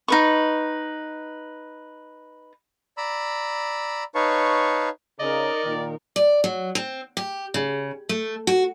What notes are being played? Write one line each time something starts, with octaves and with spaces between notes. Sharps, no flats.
D#4 B4 C#6
D5 A#5 B5 E6
D#4 B4 C#5 F5 A5 C#6
C#3 D#4 A#4 D5 D#5
A#2 D#3
D5
F#3
C4
G4
C#3
A3
F#4